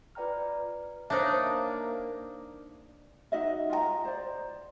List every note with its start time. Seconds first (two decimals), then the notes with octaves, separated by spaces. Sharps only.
0.15 F4 B4 D5 G5 A#5 F6
1.10 A#3 D4 D#4 C5 C#5 E5
3.32 D#4 F#4 D#5 E5
3.70 F4 D#5 G5 A#5
4.05 C5 D5